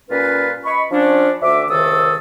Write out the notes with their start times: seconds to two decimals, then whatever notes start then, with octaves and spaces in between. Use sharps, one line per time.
0.10 A#2 G3 C#4 F4 B4
0.65 D#5 B5 C#6
0.91 F3 C#4 D4
1.42 D2 E5 D6
1.69 C#2 C3 D#3 A4 D#6 E6